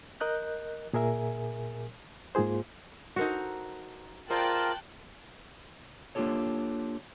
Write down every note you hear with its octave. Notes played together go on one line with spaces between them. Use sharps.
A#4 D#5 F#6 G6
A#2 G#4 A#4 E5 G#5
G#2 A#3 F4 G#4 C5
D#4 F#4 A4 A#4 C5
F4 G#4 A#4 C5 D5 G5 A5 F#6
A#3 D4 F4 G4 A4 C#5